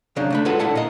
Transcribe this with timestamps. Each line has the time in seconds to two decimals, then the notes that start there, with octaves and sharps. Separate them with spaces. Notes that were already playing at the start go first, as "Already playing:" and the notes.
0.16 C#3 F#3 D4 D#4
0.30 A3 D4 B5
0.45 G#3 F4 F#4 A4 B4 F#5
0.59 A#2 D3 E4 A4 F#5 A5
0.75 A#3 D#5